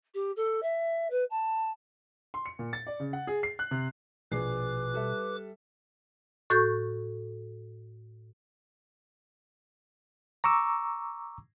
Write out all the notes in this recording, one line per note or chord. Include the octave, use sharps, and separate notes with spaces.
G4
A4
E5
B4
A5
C6
C#7
A#2
A6
D5
C#3
F#5
G#4
C7
F#6
C3
A#1 B2 G#4 B4 D6 F#6 C7
G3 A4 E5
A2 F#4 A4 C#6 G6
A#5 C#6 D6 E6